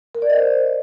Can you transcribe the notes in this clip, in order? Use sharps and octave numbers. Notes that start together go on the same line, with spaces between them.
A#4
D5
D#5
C5